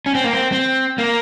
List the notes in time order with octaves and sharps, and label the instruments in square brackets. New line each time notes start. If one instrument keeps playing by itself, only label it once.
[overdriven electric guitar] C#4
C4
A#3
C4
C4
A#3